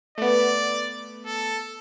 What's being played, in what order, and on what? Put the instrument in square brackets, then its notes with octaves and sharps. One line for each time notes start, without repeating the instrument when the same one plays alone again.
[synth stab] A3 B3 [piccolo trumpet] D5
[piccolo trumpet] A4